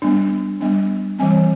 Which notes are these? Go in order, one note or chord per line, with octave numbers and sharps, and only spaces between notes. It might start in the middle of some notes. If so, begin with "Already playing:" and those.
G3 B3 D4
G3 B3 D4
E3 G3 C4 G#5